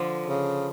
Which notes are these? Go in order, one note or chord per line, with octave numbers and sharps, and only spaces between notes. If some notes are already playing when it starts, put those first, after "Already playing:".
Already playing: D3 F3
C#3